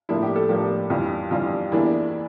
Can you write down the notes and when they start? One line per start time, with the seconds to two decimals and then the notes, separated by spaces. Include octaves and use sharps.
0.09 A2 F3 A#3 D4 E4
0.23 G4
0.36 A4
0.49 A2 F3 A#3 D4 G4
0.90 F2 E3 G3 D4 F4
1.31 F2 E3 G3 D4 F4
1.72 E2 E3 A#3 D4 E4